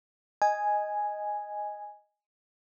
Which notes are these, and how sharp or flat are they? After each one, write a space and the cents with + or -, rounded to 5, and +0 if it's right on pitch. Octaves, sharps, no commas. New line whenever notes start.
D#5 +0 G#5 +0